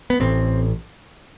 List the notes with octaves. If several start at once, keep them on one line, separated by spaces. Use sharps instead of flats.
B3
A1 A2 C4